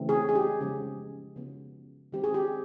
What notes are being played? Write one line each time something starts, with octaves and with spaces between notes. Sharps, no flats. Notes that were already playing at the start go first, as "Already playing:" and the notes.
Already playing: C#3 E3 A3 C4
G#4
G#4
G4
C#3 F3 G#3 B3
C#3 F3 G#3 B3
D#3 G#3 C4 G4
G#4
G4